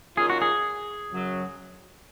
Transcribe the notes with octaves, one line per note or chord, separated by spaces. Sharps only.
D#3 A#3 C#4 F4 G#4
F#4
G#4
F#2 C#3 F#3